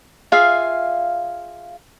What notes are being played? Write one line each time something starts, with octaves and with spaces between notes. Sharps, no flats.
F4 G#4 E5 F5